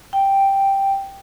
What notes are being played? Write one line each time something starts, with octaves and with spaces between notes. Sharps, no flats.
G5